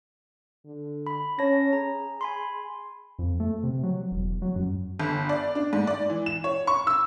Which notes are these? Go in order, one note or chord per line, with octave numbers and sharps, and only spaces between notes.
D3
B5
C#4 C#5 A5 A#6
G#4 A#5
G#5 B5 C6
F2
A3
C3
F#3
E1
F#3
F#2
G1
D5
D4
G#2
D5
E3
E7
C#5
C#6
E6